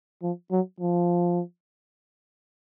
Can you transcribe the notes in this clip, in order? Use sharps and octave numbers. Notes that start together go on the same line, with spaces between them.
F3
F#3
F3